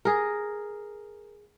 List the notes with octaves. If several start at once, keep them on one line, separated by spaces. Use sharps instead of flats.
G#4 A#4